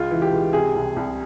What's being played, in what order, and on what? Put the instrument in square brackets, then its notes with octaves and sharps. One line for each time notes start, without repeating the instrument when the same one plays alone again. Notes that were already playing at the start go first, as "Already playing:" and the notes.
Already playing: [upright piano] C#2 F4
E3
G4
C#2
C3 G#4
C2
C2